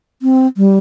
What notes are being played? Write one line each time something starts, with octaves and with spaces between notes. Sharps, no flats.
C4
G3